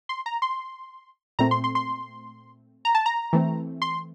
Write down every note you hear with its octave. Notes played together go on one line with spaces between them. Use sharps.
C6
A#5
C6
A#2 A3 C4 A#5
C6
C6
C6
A#5
A5
A#5
E3 A3 C4
C6